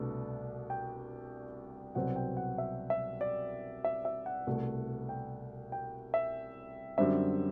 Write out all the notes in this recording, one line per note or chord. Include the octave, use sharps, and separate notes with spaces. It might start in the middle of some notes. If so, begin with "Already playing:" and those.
Already playing: C2 B2 A3 D4
G5
C2 B2 F#3 C4 F#5
G5
F#5
E5
E5
D5
E5
E5
F#5
C2 B2 A3
G5
G5
E5
F#2 D3 G3 C4 E5